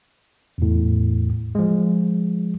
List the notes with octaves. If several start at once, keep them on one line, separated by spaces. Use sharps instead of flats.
E2 A2
F3 G#3